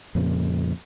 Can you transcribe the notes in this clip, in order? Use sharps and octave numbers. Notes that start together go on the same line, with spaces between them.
F2 A#2 C#3